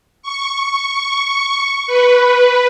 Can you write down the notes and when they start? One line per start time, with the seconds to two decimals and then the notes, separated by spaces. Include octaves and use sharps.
0.22 C#6
1.87 B4